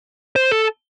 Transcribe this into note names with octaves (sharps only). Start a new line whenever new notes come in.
C5
A4